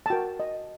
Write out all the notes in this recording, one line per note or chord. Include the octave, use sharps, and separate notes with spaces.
A5
F#4 A#4 G5
D#5